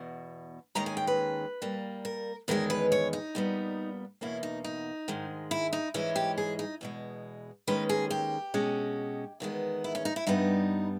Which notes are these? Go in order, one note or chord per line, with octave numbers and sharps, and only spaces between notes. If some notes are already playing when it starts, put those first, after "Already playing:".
Already playing: E2 B2
D#2 D#3 G#3 C#4 A#5
G#5
G5
B4
A#2 G3 A#3
A#4
E2 D#3 G#3 C#4 A#4
B4
C#5
D#4
A#2 G3 B3
E2 B2 A#3 C#4 E4
D#4
D#4
G#2 D#3 G#3
E4
D#4
G#2 E3 G#3 C#4 E4
G4
G#4
D#4
E2 B2 G#3
D#2 D#3 G#3 C#4 B4
G#4
G4
B2 G#3 C#4
E2 D#3 G#3 B3
E4
C#4
D#4
E4
G2 G3 B3 D#4